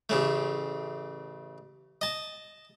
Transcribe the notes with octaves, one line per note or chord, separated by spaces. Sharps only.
A1 C#3 A3
D#5 A5